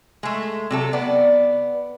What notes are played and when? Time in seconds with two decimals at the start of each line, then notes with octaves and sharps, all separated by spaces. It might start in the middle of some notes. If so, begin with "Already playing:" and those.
0.23 G#3 A3
0.71 C3 F#3 A4
0.93 B3 D5